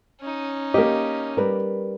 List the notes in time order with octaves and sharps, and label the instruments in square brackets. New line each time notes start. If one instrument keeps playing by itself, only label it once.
[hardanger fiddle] C#4 D#4
[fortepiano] A#3 G4 [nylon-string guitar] D#5
[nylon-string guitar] G3 A#4 B4